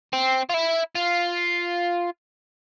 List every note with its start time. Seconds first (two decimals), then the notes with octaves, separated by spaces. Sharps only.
0.13 C4
0.49 F4
0.54 E4
0.95 F4